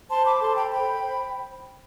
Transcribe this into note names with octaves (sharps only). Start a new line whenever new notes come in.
C5 A5 C6
B5 D6
A4 A5 C6
G5 B5
C5 G5 B5
C5